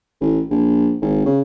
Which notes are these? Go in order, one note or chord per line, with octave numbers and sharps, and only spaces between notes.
A1
A#1
G#1
C#3